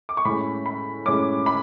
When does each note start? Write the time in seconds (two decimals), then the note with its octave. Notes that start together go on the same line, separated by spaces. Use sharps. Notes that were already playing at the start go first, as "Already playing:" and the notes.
0.09 D6
0.17 C#6
0.25 A2 G#3 C#4 B5
0.66 B5
1.06 A2 G#3 C#4 D6
1.46 B5